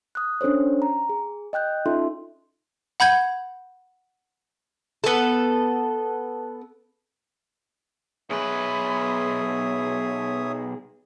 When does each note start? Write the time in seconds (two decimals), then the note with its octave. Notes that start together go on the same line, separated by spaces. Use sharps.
0.15 D#6 F#6
0.41 C#4 D4 A4 C5 C#5
0.82 A#5
1.09 G#4
1.53 D#5 G5 F#6 G6
1.86 C#4 D#4 F4 A4 E5 C6
3.00 F#5 B5 G6 G#6
5.04 B3 A4
8.30 B1 G#4 B4 C#5 E5 D#6